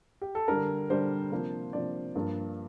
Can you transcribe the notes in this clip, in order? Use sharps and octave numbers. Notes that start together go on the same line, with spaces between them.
G4
A4
D3 G3 D4 A#4
D3 G3 D4 C5
C3 F3 A#3 D4
C3 F3 A#3 D4 D5
G2 F3 A#3 D4